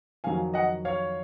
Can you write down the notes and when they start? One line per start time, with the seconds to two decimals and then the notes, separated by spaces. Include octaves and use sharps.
0.24 F2 D#3 F#3 F5 G#5
0.54 D#5 F#5
0.85 C#5 F5